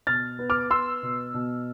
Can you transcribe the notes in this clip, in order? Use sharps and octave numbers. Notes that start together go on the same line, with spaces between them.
B2 F6 A6
B3
D6 F6
B3 C6 E6
B2
B2